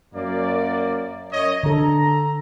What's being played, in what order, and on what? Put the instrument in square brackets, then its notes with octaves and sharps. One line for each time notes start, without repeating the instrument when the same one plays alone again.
[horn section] F#2 A#3 D5
F#2 C#5 D#5
[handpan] D3 A4 [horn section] A#5